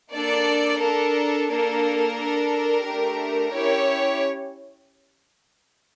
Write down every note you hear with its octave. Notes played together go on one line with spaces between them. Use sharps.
A#3 D4 A4 D5
D4 A4 A#4
A#3 D4 A4 A#4
D4 A4
A3 D4 G4
C#4 E4 G4 C#5